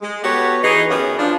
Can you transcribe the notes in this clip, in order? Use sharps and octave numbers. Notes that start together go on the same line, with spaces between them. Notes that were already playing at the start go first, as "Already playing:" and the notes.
G#3
B3 F#4 G4 A4 B4 C#5
E3 D#4 G#4
F#2 B3 G4 G#4 C#5
F3 D4